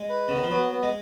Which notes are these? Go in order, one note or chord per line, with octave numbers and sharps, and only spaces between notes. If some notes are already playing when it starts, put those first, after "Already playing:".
Already playing: G#3
B4
C#3 B3
D#3
F3
F#3 B3
B3
G#3